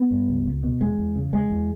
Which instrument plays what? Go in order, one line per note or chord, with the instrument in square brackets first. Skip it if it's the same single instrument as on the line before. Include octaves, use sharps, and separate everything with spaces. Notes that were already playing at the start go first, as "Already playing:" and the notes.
Already playing: [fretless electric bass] B3
G2
C#2
C#2
B2
E2 G#3
E2
C#3
E2 G#3
E2